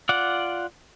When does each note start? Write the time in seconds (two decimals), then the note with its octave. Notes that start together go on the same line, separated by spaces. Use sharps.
0.09 F4 D5 F#5